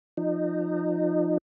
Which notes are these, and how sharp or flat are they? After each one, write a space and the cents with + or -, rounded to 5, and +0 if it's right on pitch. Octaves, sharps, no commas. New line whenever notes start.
F3 +0 D#4 -25